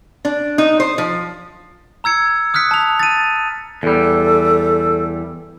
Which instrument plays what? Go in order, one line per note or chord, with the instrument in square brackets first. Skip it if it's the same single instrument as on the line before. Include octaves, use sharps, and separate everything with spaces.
[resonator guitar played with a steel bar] D4
D#4
C5
F3
[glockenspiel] A#5 E6 G#6 C#7
D#6 F6 F#6 B6 C#7
A5 F7
A6 D#7
[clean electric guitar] E2 G3 [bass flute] A4